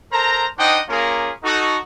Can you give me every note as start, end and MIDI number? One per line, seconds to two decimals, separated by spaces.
0.12 0.45 69
0.12 0.45 70
0.12 0.45 72
0.12 0.45 82
0.58 0.79 62
0.58 0.79 63
0.58 0.79 72
0.58 0.79 75
0.58 0.79 78
0.58 0.79 79
0.88 1.30 58
0.88 1.30 61
0.88 1.30 65
0.88 1.30 68
0.88 1.30 70
1.43 1.76 63
1.43 1.76 66
1.43 1.76 69